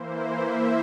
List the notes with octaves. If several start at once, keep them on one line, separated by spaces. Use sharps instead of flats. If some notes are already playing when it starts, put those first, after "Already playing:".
Already playing: E3 A#3 E4 C5
E5